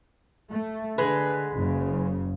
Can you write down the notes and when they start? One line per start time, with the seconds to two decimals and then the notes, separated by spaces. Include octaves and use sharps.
0.53 A3
0.98 D3 G#3 B4
1.54 F#1 C#3